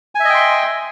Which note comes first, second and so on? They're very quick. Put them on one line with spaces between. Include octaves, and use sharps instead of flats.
G#5 E5 D#5 G5 C6